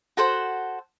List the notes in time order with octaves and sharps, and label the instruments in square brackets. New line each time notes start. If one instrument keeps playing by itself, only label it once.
[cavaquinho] F#4 A4 C5 F#5